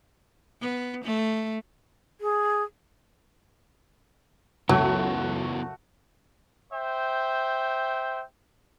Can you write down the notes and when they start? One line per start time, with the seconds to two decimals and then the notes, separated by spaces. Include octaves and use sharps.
0.61 B3
1.05 A3
2.21 G#4
4.69 C#2 F#2 F#3 A3 B3 E4 F#4 A4
6.72 C5 E5 G5